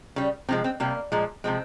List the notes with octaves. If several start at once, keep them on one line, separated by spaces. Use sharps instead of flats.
C#3 G3
C3 F3 G#3 C4
C4
C3 G3 A#3
A#2 F3 G#3
C3 F3 G#3 C4